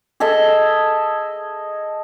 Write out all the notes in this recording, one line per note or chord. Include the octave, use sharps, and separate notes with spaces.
G#4 A4 D#5 E5